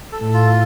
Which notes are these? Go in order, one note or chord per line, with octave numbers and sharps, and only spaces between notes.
A4
A2
F4